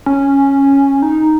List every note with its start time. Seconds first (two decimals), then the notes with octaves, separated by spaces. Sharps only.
0.06 C#4
1.02 D#4